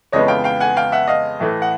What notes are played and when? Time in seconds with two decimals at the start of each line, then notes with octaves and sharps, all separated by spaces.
0.12 F2 C#3 E3 G#3 B3 C#5 D#5
0.28 F5 G5
0.44 F5 G5
0.60 F#5 G#5
0.77 F5 G5
0.92 E5 F#5
1.08 D#5 F5
1.40 A2 E3 A3
1.62 F#5